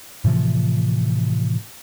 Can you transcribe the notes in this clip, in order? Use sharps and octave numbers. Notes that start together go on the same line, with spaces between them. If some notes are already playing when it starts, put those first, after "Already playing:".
A2 C3 E3 F3